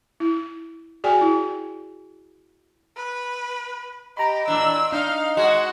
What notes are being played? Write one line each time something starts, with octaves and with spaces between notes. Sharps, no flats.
E4
F#4 G#4 D5 G5 G#5
E4
B4
G4 D#5 A#5 B5
A#2 E3 D4 E6
D4 D#4 F5
G#3 F#4 D#5 F#5 C6 G#6